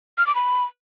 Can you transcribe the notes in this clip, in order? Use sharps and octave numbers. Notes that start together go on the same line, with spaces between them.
F6
D6
B5